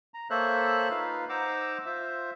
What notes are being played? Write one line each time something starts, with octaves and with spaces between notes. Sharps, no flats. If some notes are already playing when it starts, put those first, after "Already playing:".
A#5
A#3 A4 C5 C#5 E5 F#6
D#4 F4 B4 F5
D#4 C5 F#5 A#5 D6 E6
F4 C5 E5